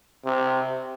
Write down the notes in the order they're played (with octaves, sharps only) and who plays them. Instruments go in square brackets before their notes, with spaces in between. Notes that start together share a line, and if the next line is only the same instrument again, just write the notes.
[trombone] C3